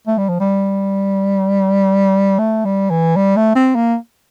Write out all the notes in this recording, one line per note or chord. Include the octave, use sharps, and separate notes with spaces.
A3
G3
F3
G3
A3
G3
E3
G3
A3
C4
A#3